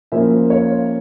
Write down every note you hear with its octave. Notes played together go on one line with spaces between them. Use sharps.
A#2 F3 A#3 C#4 E4 C5 E5
C#5 F5